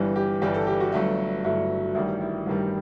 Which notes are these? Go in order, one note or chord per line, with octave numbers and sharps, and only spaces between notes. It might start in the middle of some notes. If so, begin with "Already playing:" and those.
Already playing: G1 G2 E3 G3
G4
G1 G2 E3 G3 G4
A4
G4
F#4
G1 G2 F#3 A3
G1 G2 F#3 A3 E4
A1 G2 D#3 G3 E4
E4
A1 G2 D#3 G3